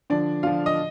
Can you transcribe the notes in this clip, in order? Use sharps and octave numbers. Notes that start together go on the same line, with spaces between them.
D3 F3 D4 D5
D3 F3 F4 F5
D#5 D#6